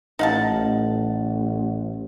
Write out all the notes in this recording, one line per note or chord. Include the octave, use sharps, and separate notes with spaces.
A1 D#4 F5 F#5 A5
A1